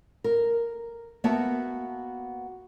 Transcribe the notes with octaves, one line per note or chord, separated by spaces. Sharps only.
A#4
A#3 B3 F#4 E5 A5